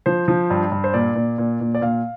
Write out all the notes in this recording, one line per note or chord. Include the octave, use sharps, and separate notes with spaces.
F3 C5
F3
G2
G2
C5
A#2 D5
A#2
A#2
A#2
D5
A#2 F5